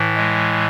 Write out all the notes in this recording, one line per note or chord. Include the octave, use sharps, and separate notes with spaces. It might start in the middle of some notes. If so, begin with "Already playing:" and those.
Already playing: A2 E3
G#3